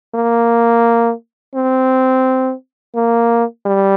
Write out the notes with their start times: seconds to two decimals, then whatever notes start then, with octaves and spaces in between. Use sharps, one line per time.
0.14 A#3
1.55 C4
2.95 A#3
3.66 G3